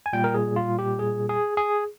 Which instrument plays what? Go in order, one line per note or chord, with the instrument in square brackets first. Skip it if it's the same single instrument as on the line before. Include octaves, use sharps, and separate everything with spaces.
[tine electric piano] G#5
A#2 G3 G5
A#4
G#4
F4
G4
G#4
G#4
G#4